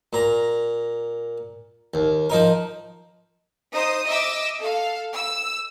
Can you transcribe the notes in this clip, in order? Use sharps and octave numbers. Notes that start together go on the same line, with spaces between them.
A#2 A#5
D#2
F3 D#4 A#4
D#4 C5 D#6
D#5 E5 D6 E6
A4 F5
E6